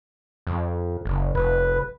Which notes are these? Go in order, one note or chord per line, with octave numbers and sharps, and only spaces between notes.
F2
F#1
F1 B4